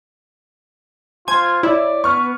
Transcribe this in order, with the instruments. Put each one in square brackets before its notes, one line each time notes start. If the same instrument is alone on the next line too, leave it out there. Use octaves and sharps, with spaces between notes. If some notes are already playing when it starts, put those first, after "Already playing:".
[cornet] F4 [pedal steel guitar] C5 G#5 C6 [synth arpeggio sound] G#6
[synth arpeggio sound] E4 [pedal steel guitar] C#5 E5 B5 [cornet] D5
[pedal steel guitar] B3 [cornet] B4 [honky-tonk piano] C#6 F6